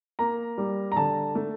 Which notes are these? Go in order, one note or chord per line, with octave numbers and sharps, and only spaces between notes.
A#3 A#5
G3
A#5
D3 A5
A3